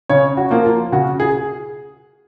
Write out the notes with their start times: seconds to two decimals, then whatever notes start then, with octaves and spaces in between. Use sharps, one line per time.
0.09 C#3 C#5
0.37 F#4
0.51 F3 A#3
0.65 F4
0.92 C#3 F#4
1.20 G#4